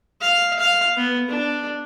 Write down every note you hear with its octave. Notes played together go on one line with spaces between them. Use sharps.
F5
F5
B3
D4